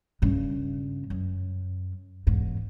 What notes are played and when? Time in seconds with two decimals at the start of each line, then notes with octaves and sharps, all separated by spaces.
0.22 G2 C#3
1.10 F#2
2.27 E2 G#2